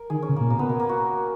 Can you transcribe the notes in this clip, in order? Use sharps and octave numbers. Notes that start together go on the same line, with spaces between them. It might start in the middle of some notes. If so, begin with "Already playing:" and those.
Already playing: A#4
D#3 G#4
C#4
C#3
A#2 A#3
B2 A#3
B3
A#3
A#3
F#4